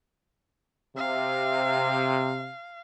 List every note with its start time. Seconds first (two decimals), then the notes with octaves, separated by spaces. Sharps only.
0.97 C3 F5